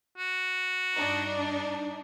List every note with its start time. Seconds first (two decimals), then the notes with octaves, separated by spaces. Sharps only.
0.18 F#4
0.95 G2 D4 D#4